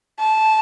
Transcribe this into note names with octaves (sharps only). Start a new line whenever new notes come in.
A5